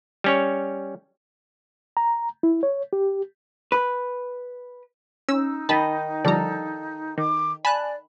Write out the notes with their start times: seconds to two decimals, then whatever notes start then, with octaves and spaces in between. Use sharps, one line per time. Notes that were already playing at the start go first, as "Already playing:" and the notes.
0.24 G3 C#4 C#5
1.97 A#5
2.43 E4
2.63 C#5
2.93 G4
3.72 B4
5.29 C#4 D#4 E6
5.69 D#3 D#5 A5 B5
6.25 D3 F3 G3 A4 D5 F5 A#5
7.18 D#3 D6
7.65 D5 G#5 A5 B5 F#6